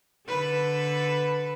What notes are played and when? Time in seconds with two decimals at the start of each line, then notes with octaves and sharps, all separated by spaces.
0.28 D3 A4 B4